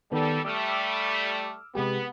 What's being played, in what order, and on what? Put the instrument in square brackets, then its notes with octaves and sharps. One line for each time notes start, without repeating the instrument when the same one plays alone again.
[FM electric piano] D#3 B3 [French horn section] G3 A4
[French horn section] G3 A3 [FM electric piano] D6 E6 F6
[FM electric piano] C3 G#3 G4 [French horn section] B3